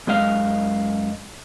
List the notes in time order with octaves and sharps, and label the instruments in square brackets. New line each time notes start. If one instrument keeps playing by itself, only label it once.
[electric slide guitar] F#2 G#3 D#5 F5